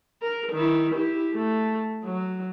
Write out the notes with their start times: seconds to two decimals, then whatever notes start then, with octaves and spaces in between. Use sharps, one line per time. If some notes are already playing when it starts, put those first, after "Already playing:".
0.22 A#4
0.53 D#3 E4
0.94 E4 G4
1.34 A3
2.04 F#3